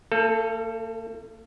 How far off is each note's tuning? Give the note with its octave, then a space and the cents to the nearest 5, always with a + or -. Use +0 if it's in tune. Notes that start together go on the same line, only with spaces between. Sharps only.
A#3 -45 A4 +0